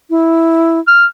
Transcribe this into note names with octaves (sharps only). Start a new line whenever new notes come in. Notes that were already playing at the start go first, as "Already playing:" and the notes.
E4
F6